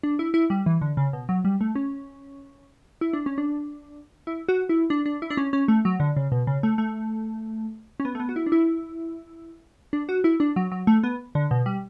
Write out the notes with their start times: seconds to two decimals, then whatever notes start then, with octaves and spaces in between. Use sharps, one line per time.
0.03 D4
0.19 E4
0.34 E4
0.50 G3
0.66 E3
0.81 D3
0.97 C#3
1.13 B2
1.29 F#3
1.45 G3
1.61 A3
1.75 C#4
3.01 E4
3.13 D4
3.26 C#4
3.38 D4
4.27 E4
4.49 F#4
4.69 E4
4.90 D4
5.06 D4
5.22 E4
5.30 D4
5.37 C#4
5.53 C#4
5.68 A3
5.85 F#3
6.00 D3
6.16 C#3
6.32 B2
6.47 C#3
6.63 A3
6.78 A3
8.00 C#4
8.05 B3
8.15 A3
8.20 B3
8.29 F#4
8.36 E4
8.46 D4
8.52 E4
9.93 D4
10.09 F#4
10.24 E4
10.40 D4
10.56 F#3
10.72 F#3
10.87 A3
11.03 B3
11.35 D3
11.51 B2
11.66 G3